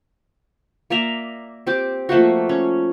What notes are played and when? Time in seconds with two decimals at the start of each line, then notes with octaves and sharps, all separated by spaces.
0.90 A#3 D5 E5 A#5
1.67 C4 G4 D6
2.09 F3 A3 A#3 F#4
2.49 C#4